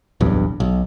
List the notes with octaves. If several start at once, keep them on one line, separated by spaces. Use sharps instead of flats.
D1 B1 E2 G2
B1